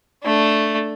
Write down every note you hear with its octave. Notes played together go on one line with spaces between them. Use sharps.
A3 D4